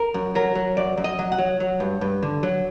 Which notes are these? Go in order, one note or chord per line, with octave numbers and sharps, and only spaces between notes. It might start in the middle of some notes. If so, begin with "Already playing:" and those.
Already playing: A#4
F#2
F#3 A#4
F#3
F#2 D5
F#2
D#5
F#3
F#5
F#3
F#3
G2
G2
D3
F#3